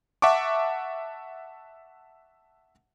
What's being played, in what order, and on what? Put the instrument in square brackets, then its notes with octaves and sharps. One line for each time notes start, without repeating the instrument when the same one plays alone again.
[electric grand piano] E5 F#5 A5 C#6 D6